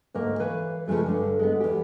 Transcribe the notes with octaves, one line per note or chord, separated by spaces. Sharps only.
D2 G#2 A#3
E3 B4 C#5 F5
C#3 F3 F#3 G#3 A3
G2 D3
G#3 B3
E2 G4